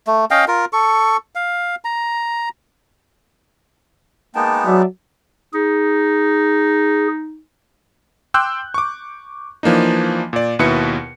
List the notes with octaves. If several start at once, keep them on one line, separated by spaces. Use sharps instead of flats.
A3
C#4 D#5 F5 G5
F4 A#4
A4 C#6
F5
A#5
G#3 A#3 B3 D#4 G5 A5
F#3 D5 E5 A5
D#4 G#4
G5 C6 D6 E6 F#6 G6
C#6 D6
E3 F3 A#3 D4 D#4
A#2 D5
D#2 B2 E4 B4 C#7